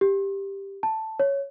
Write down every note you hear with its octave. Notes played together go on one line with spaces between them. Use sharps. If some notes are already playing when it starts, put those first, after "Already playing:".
G4
A5
C#5